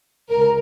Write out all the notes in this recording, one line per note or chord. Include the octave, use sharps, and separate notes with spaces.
C#2 A#4